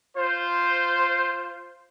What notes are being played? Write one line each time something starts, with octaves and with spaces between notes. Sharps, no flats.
F4 C5